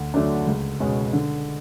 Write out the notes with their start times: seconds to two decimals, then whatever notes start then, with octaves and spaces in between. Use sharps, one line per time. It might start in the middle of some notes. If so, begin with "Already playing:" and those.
Already playing: D2
0.14 D3 F#3 A3 D4
0.47 C#2
0.80 B2 G#3 C#4
1.13 D3